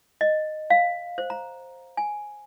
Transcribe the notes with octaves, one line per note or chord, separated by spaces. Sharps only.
D#5
F5
C5
A#5
G#5